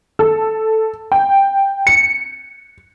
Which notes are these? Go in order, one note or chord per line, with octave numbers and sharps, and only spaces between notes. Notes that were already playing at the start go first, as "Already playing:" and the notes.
A4
G5
C#7